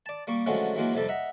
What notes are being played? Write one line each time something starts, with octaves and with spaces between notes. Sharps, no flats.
D5 A5
G3 A#3 C#6
D3 F3 F#3 G#3 A3 C#4
E3 F#3 G#3 A#3 F4
F2 C3 G3 A4
D#5 E5 F#5 A#5